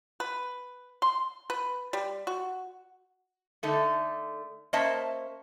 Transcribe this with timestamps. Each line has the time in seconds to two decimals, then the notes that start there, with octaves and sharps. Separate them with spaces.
0.20 B4
1.02 C6
1.50 B4
1.93 G3
2.27 F#4
3.63 D3 A3 D#4
4.73 A#3 C#4 C5 D#5 E5 A5